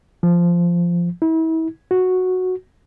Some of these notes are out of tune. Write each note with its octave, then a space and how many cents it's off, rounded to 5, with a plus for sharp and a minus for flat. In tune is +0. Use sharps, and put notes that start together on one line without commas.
F3 -10
E4 -35
F#4 -5